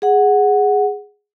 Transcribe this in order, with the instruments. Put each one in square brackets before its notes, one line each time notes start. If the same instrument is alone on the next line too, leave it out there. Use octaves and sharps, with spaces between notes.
[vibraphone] G#4 F#5